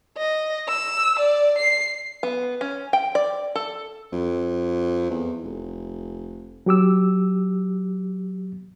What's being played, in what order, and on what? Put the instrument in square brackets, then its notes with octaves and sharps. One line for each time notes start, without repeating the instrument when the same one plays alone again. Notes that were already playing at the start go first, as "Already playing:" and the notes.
[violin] D#5
E6
D5
C7
[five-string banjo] B3
C#4
G5
D5
A4
[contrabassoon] F2
E2
F1
[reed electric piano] F#3 G4 D6 E6